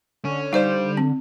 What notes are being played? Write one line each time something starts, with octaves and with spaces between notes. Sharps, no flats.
D3 C#4
G3 D#4 C5 D5 F5
C4